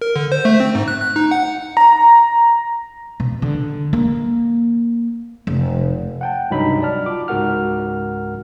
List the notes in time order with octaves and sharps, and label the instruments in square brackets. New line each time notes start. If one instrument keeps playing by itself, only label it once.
[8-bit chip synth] A#4
D3
C5
A3
C4
G#2
F#6
F#6
D#4
F#5
[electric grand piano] A#5
[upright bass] B2
D3
A#3
F1
[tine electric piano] F#5 G5 A5
C#2 G2 C3 F#3 D#4 B5
D5 A5 F6
F4 D6
C#2 G#2 F#4 A#4 F#5 F6